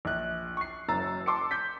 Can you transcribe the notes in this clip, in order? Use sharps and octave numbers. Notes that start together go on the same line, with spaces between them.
A#1 F#6
C#6 C7
F#1 F#2 A#5 E6 A6
A5 C6 D6 E6 C#7
G6 B6